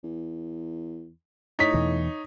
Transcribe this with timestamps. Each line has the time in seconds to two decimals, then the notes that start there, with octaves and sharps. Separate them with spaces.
0.04 E2
1.59 A2 D#4 C#5 B6
1.74 E2 B2 E3